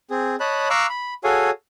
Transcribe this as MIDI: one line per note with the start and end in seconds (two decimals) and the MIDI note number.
0.11 0.36 60
0.11 0.36 68
0.40 0.68 73
0.40 0.68 75
0.40 0.68 81
0.40 0.68 83
0.40 0.68 90
0.70 0.87 77
0.70 0.87 82
0.70 0.87 85
0.70 0.87 86
0.70 0.87 88
0.70 0.87 90
0.89 1.14 83
1.24 1.51 66
1.24 1.51 68
1.24 1.51 69
1.24 1.51 73
1.24 1.51 77
1.24 1.51 80